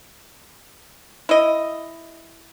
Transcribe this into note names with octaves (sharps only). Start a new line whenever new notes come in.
E4 D#5